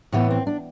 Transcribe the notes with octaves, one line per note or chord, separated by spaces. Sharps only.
A2 E3 B3
C4
D4